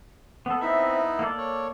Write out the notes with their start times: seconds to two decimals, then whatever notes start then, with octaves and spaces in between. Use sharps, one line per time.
0.46 B3 A4
0.61 B3 C4 D#4 E4 E5
1.19 A#3 A4 D5
1.38 C#5